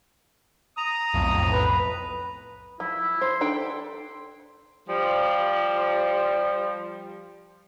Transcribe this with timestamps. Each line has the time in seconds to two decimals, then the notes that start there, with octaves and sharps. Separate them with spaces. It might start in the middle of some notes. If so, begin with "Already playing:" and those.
0.77 A#5 D#6
1.13 B1 F2 A2
1.53 B4
2.80 F3 E4
3.21 C5 C6
3.41 D4 A4 G5
4.88 F3 G3